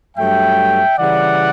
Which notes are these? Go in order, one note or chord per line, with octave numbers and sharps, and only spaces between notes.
G2 F#3 A3 E5 G5
C#3 E3 G3 D5 F#5